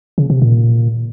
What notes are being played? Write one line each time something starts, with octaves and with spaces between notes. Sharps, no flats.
C#3
C3
A#2